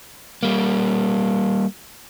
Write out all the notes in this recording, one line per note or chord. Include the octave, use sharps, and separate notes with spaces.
G3 A#3